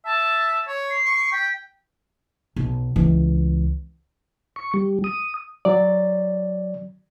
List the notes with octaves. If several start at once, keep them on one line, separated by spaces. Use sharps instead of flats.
E5 A5
C#5
C7
C#6
G5 B6
B1
C#2 E3
C#6
G3
D#6
F#3 D5